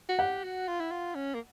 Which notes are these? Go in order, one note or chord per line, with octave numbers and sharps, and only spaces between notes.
F#4
G4 F#5
F#4
F4
E4
F4
C#4
A#3